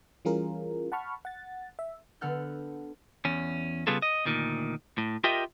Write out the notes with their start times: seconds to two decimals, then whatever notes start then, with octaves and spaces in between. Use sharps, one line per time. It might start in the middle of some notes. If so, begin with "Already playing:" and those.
0.25 E3 G3 C#4 F4 G#4 A#4
0.92 F#5 A5 B5 C#6 F6
1.25 F#5 A6
1.79 E5
2.21 D3 B3 A4 F#5 F6 G6
3.25 E2 C#4
3.87 C#3 G3 B3 F4 G#4 A4
4.02 D#5
4.25 D2 A#2 D#3
4.98 A2
5.24 F4 G4 A#4 D#5 E5 G5